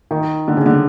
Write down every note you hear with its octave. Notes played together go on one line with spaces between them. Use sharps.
D#3
D3
C#3
D3